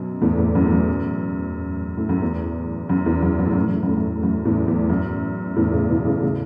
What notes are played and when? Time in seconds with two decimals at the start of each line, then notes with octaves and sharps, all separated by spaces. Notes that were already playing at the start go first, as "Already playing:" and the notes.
Already playing: F#2 B2
0.21 E2 A2
0.38 E2 A2
0.55 F#2
0.66 E2
0.72 F#2
1.97 A2
2.09 F#2
2.22 E2
2.89 F#2
3.06 E2
3.22 F#2
3.39 F#2
3.46 A2
3.53 F#2
3.61 A2
3.68 F#2
3.75 A2
3.83 F#2
3.89 A2
3.97 F#2
4.23 F#2
4.45 E2 A2
4.68 E2
4.90 F#2
5.56 E2 A2
5.73 A2 C#3
5.90 B2 E3
6.06 A2 C#3
6.23 A2 C#3